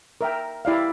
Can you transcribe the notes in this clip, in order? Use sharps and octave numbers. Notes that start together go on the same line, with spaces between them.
A#4 E5 G5
E4 G4 D5 F5